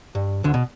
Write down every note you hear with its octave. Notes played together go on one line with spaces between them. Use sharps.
G2
D2 D3
B2